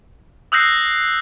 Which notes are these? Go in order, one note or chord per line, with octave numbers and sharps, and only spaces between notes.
D#6 E6 F#6 G6 A#6 C7